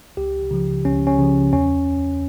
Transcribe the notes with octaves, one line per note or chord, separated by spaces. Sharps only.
C#2 G4
C#3 F3
C#2 C#4
C#4
C#3 F3
E2 C#4